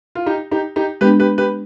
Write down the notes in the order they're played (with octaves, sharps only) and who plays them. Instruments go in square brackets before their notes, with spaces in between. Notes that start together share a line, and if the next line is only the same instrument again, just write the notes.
[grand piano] F4
D#4 G4
D#4 G4
D#4 G4
[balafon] G#3 B3 D4 [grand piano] G4 B4
[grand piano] G4 B4
G4 B4